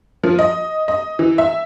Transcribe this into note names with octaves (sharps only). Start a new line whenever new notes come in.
F3
D#5
D#5
E3
E5